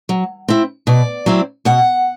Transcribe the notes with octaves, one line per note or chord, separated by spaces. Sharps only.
F#3
C4 E4
B2 D5
F#3 C4 E4
B2 F#5